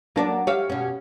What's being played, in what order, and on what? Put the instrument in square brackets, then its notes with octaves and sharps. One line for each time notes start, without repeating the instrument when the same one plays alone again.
[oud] F#3 A#4 D5 [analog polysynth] A#3 D4 A5
[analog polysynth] G4 [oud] C#5 E5 F5
[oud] B2 C#4